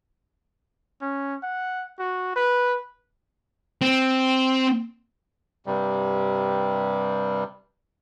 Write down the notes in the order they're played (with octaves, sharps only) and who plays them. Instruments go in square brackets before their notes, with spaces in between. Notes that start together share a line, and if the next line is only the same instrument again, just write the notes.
[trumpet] C#4
F#5
F#4
B4
[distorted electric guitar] C4
[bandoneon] G2 C3 G3